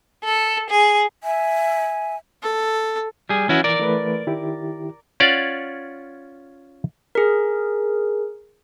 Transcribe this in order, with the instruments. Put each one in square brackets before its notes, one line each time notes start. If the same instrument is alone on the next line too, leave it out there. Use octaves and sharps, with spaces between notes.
[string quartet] A4
G#4
[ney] E5 [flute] G#5
[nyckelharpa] A4
[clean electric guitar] G3 G#4
[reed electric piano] E3 [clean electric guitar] C#4 E4 F#4
[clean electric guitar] A#4 D5
[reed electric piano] E3 A3 B4
D#3 E4 G4
[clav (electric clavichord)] C#4 F4 C#5 D5 F#5
[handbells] G#4 A#4